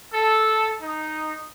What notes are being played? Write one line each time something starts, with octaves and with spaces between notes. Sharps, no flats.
A4
D#4